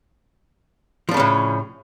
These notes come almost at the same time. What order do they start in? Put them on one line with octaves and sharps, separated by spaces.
F3 D4 C#3 C#4 A2